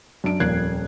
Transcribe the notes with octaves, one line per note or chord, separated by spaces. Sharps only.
F#2 D4 D7
D#1 F2 A#3 F#6 G#6 C7